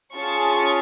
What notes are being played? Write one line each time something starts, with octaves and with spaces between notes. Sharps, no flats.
C#4 F4 G#4 A5 C#6